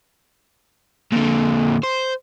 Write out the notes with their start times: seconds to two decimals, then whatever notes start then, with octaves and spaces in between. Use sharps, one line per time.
1.12 A#2 D3
1.83 C5